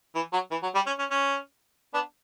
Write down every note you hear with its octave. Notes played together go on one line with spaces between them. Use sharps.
E3
F#3
E3
F#3
G3
C#4
C#4
C#4
B3 D4